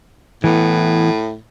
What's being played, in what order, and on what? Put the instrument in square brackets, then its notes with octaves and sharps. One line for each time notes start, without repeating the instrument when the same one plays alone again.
[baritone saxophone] A2 [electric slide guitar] E3 B3